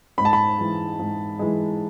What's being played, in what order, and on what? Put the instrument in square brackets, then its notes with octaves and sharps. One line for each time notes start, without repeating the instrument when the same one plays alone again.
[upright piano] G#2 [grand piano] B5
[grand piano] A5
B5
[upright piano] E3 G#3
G#2
E3 G#3